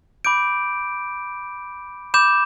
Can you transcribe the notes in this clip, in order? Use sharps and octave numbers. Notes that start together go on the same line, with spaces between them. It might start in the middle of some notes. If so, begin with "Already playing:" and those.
B5 D6 G6 D7
B5 D6 G6 E7